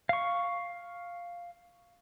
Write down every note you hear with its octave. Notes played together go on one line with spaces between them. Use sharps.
F5 C#6